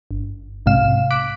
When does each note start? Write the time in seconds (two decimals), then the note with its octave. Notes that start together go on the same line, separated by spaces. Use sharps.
0.11 G1
0.66 B1 G#2 C3 F5 E7
1.11 D6 F#6 B6 D7